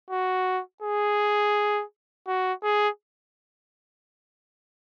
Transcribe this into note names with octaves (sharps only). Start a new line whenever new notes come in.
F#4
G#4
F#4
G#4